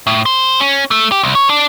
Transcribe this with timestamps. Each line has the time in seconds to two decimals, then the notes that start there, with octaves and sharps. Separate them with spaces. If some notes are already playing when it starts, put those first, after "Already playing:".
0.07 A2
0.26 C5
0.60 C#4
0.91 A3
1.12 G4
1.23 C2
1.35 C#5
1.50 D4